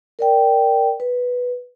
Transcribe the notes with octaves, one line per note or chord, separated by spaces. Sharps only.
A#4 D5 G5
B4